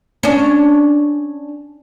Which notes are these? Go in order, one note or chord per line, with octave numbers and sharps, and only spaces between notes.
C#4 D4